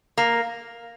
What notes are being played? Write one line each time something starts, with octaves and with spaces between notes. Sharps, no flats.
A#3